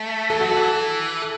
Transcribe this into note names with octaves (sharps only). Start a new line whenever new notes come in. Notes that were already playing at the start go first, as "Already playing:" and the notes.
Already playing: A3
E3 A4
F#3 F#4
A4
E3
A4